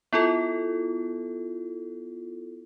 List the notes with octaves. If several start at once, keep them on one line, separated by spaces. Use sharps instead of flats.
B3 E4 F4 A4